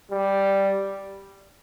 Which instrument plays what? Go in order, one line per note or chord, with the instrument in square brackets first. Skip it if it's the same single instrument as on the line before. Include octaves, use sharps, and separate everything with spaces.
[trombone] G3